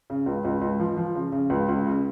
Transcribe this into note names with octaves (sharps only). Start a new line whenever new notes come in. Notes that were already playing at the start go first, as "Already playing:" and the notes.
C#3
C#2
C#2
C#2
F3
F3
C#3
C#3
C#2
C#2
C#3